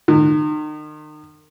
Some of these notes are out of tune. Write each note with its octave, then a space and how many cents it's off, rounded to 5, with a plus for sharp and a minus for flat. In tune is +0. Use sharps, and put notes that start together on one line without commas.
D#3 -35